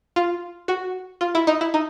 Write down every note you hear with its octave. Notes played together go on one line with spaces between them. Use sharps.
F4
F#4
F4
E4
D#4
E4
D#4